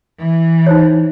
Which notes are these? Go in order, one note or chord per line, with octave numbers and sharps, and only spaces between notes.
E3
D#4 C5 C#5